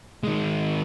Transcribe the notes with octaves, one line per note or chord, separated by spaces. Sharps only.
D#3 G#3